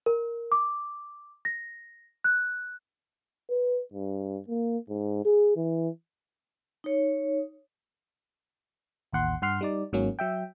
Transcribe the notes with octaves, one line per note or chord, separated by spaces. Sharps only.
A#4
D6
A#6
F#6
B4
G2
A#3
G#2
G#4
E3
D#4 C#5
A1 D#2 F#5 C6
G2 F#5 C6 F6 C7
G3 D#4 D5
G#1 G#2 F#3 A#3 C#4
F#3 E5 G5